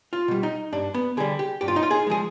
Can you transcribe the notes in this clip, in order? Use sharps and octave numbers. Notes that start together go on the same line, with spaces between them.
F4
B2 G3
D#4
G2 D4
B3
D3 G3 G#4
G4
G2 G4
F4
D#4
F4
G#4
F3 G#3 G#4